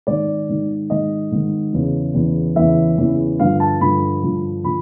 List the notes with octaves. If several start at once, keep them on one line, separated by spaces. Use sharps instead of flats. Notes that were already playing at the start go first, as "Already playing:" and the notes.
G#2 D#3 D5
G#2 D#3
G#2 D#3 D#5
G#2 D#3
E2 C#3 E3
E2 C#3 E3
E2 C#3 E3 E5
E2 C#3 E3
G2 D3 F3 F5
A5
G2 D3 F3 B5
G2 D3 F3
D3 F3 B5